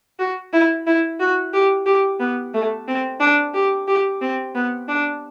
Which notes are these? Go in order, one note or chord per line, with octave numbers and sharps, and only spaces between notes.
F#4
E4
E4
F#4
G4
G4
B3
A3
C4
D4
G4
G4
C4
B3
D4